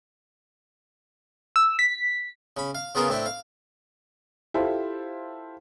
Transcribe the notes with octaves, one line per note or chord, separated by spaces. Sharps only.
E6
B6
C#3 B5
F5
C#3 B3 F4 G#4 A#4 C6
A2 C4 D4 E4
F5
E4 F4 G4 A4 C5